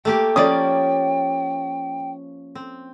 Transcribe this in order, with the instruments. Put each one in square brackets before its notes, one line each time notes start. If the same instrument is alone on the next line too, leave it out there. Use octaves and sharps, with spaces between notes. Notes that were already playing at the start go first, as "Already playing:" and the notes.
[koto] A3 A#3 G4 [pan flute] G5
[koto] F3 A#3 [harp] C#4 [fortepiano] D5 D#6
[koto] C4